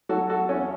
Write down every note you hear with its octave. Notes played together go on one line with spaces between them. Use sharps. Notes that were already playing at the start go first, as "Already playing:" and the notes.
F#3 F#4 A4
F#4 A4
E2 C#4